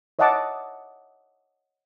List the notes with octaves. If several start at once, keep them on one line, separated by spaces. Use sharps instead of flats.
C#5 D#5 E5 F#5 A5 D6